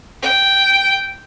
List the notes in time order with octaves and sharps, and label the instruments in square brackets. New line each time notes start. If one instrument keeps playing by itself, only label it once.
[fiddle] G5